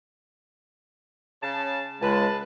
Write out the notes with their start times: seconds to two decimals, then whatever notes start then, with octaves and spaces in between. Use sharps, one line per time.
1.43 C#3 A5
2.01 C#2 C#3 G#3 B4 A5